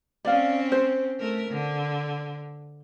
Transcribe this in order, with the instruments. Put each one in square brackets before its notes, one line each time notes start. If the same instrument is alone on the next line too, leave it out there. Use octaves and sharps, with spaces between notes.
[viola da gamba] C4 C#4 [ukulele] D5 F5
[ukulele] C5
[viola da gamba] A3 A#4
D3